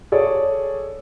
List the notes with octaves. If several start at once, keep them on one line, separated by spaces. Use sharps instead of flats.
G#4 A4 C#5 D5